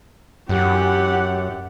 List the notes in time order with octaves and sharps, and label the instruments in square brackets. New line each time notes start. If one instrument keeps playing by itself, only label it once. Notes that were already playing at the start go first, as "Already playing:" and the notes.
[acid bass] F#2 [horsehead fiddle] G4 F#5